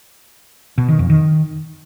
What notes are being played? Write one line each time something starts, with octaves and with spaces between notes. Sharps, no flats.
B2
D#3
F2
D#3